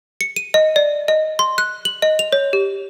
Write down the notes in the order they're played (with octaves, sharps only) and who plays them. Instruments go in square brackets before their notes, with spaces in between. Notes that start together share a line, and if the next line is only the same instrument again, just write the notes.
[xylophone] C#7
D#7
D#5
D5
D#5
C6
F#6
F#7
D#5
F7
C#5
G4